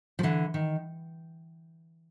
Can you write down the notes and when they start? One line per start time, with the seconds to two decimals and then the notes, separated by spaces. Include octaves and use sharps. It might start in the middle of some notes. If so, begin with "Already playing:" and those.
0.19 F3
0.23 D3 E3
0.54 D#3